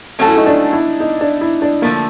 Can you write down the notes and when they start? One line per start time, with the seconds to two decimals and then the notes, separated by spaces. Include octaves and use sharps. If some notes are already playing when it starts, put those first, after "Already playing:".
0.19 F#3 A3 C#4 F#4 A4
0.27 E4
0.37 D#4
0.46 D4
0.73 E4
1.00 D#4
1.21 D4
1.41 E4
1.62 D4
1.82 D3 F3 A3 A#3